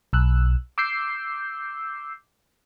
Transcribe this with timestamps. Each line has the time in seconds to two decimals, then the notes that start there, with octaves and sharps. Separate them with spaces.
0.13 B1 E6 F#6
0.78 D6 E6 G6 C7